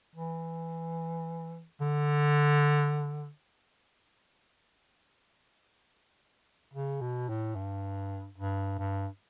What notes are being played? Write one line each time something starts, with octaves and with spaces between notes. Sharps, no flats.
E3
D3
C#3
B2
A2
G2
G2
G2